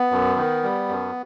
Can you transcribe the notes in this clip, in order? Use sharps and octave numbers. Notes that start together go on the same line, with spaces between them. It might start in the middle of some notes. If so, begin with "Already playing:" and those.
Already playing: B3
F#2
D#3
G3
F#2